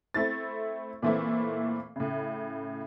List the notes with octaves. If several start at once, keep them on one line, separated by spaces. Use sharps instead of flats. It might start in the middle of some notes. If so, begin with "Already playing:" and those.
A3 C4 E4 A6
A#2 E3 A3 C4 E4
A2 C#3